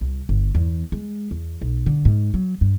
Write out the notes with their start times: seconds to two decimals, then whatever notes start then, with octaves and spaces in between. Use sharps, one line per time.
0.01 C2
0.29 G1
0.55 E2
0.92 G#3
1.31 E2
1.62 B1
1.86 D3
2.05 G#2
2.34 F#3
2.61 G2